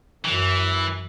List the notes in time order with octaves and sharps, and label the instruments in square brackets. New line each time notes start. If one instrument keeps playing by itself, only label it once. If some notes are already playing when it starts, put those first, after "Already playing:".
[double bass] F#2 [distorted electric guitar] E3